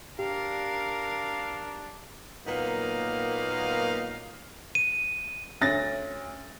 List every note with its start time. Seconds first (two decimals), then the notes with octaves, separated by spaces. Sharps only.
0.19 D4 G4 A#4 F5
2.46 A#2 F#3 A#3 B3 D#4 F5
4.75 D#7
5.61 D2 C#4 A6 A#6